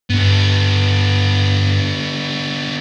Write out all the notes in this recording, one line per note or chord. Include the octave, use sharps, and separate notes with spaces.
G2 D3 B3